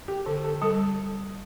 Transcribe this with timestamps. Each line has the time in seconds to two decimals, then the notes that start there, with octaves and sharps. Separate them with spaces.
0.08 G4
0.26 D3 A4
0.44 A4
0.61 G3 A4